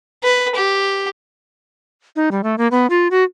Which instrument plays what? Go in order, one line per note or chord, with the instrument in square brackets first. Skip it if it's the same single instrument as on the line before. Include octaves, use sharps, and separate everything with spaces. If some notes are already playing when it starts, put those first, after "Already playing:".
[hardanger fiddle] B4
G4
[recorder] D#4
G3
A3
A#3
B3
F4
F#4